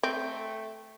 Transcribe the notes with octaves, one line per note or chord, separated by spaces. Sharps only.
A3 C4